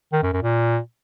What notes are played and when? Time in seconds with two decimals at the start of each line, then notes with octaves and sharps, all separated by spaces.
0.13 D#3
0.23 F#2
0.33 F#2
0.43 A#2